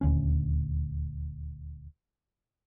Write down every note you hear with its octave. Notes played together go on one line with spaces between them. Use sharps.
D#1 D2 C#4